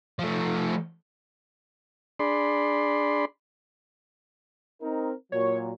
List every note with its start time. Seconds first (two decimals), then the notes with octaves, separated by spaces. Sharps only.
0.19 F3 A3
2.19 D4 G#4 D5 B5 C6
4.82 C4 D#4 A#4
5.32 A#2 F#3 C#5